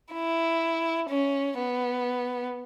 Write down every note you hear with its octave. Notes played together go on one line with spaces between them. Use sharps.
E4
C#4
B3